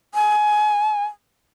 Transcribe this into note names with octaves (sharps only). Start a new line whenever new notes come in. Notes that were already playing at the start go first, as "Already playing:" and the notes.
G#5